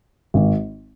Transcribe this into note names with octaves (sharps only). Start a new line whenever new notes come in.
G#1